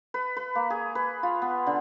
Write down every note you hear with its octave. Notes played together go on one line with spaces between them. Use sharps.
B4
B4
A#3
G#4
B4
F4
B3
D3